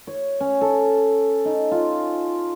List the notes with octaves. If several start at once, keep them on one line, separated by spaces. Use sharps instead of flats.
C#5
C#4
A4
D#4
F4